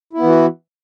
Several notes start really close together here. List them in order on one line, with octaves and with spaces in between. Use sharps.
E4 B3 E3 F#4